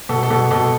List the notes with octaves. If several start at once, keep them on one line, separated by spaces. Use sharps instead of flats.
B2 A4
A4
B2
B2 A4